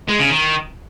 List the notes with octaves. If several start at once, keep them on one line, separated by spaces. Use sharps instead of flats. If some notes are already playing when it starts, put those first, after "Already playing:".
G#3
C#3
D#3